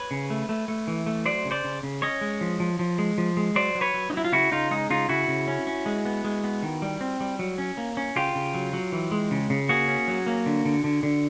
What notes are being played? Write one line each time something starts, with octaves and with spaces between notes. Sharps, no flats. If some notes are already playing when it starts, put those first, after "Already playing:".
Already playing: B4 C#5
C#3
A3
A3
A3
E3
A3
F#3 C5 D5
C#3
C5 D5
C#3
C#3
C#4 C#5 D#5
G#3
F3
F3
F3
G#3
F3
G#3
F#3 C5 D5
F#3
B4 C#5
F#3
D#4
F#3 E4
F4
C#3 E4 F#4
C#3 D#4 F4
G#3 D#4
C#3 D#4 F4
C#3 E4 F#4
C#3
C#4
C#4
G#3
B3
G#3
B3
D#3
G3
C4
G3
F#3
C#4
A#3
C#4
C#3 F4 G4
C#3
F#3
F#3
E3
G#3
C#3
C#3
A#3 F#4 G#4
C#4
F#3
A#3
D3
D3
D3
D3